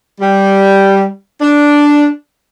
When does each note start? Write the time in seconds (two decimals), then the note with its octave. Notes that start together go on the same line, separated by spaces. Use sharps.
0.21 G3
1.42 D4